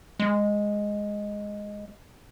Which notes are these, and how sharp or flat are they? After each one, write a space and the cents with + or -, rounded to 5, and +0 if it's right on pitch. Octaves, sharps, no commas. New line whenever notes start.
G#3 -5